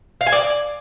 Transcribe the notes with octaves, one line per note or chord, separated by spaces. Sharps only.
F5
G#5
D5